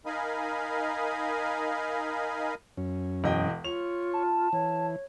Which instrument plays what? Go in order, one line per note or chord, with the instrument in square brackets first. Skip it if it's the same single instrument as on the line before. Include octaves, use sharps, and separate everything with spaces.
[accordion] D#4 A#4 D#5 F5 G#5 B5
[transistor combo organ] F#2 C#4
[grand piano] E1 D#5 G5
[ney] F4 [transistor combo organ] C#5 [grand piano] F7
[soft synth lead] A5
[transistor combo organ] E3 [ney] C#5